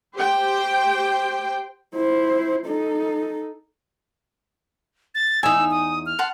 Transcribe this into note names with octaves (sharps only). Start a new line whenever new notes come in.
G4 C5 G5
E4 C5
D#4 A4
A6
E2 D#4 G#5 E6
D#6
F6
F#5 A5 C6